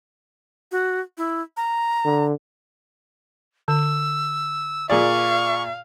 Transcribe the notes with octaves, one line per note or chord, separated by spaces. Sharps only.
F#4
E4
A#5
D3
D3 E6
A#2 G#4 D5 F5 C#6